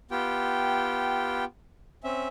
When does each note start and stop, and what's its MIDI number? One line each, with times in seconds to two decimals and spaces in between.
0.11 1.44 59
0.11 1.44 65
0.11 1.44 67
0.11 1.44 79
2.04 2.28 60
2.04 2.28 61
2.04 2.28 76